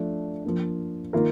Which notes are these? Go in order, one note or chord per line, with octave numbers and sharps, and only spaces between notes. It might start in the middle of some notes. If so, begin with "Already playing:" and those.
Already playing: F3 A3 D4
F3 A#3 D4
D#3 A#3 F4 A#4